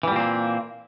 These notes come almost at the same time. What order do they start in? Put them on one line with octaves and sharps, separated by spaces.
E3 G3 A#2 C4 A#3